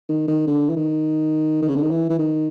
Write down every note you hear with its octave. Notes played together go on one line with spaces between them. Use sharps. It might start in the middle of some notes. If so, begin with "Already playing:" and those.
D#3
D#3
D3
E3
D#3
D#3
C#3
D3
D#3
E3
E3
D#3